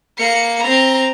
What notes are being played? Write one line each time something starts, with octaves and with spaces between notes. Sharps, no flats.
A#3 C#7
C4 A#5